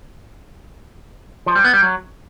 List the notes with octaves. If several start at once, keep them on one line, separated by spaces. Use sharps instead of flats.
F3
G3
B3
G3
F#3